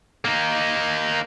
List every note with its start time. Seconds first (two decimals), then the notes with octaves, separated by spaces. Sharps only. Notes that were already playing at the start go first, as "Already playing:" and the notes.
0.25 A#3 D#4